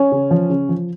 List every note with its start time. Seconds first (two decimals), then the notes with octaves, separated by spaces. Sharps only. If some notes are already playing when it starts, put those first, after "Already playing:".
Already playing: C#4
0.12 C#3
0.31 F3
0.50 C#3
0.69 F3